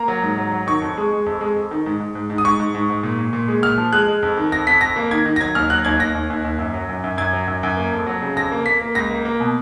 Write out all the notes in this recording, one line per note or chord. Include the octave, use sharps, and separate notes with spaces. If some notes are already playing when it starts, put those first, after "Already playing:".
Already playing: A#3 A#5
F#3
G#2
F#3
F#3
D#3 C#6
F2
G#3
G#3
F2
G#3
F2
D#3
G#2
G#2
G#2
G#2
D#6
G#2 C#6
G#2
G#2
G#2
A#2
A#2
A#2
G#3
A#2 F6
F3
G#3 F#6
G#3
F2
D#3
F2 A#6
F2 B6
F2 A#6
A#3
D#3 G#6
D#3
A#6
F#3 G#6
D#2 F6
F#3 F#6
D#2 G#6
D#2 A#6
D#2
D#2
D#2
F#2
F#3
F#2
F#2
F#2 G#6
F#3
F#2
F#2
A#3
F2
F#3
C#3
F2 A#6
A#3
A#3 B6
A#3
C#2 A#6
A#3
A#3
B2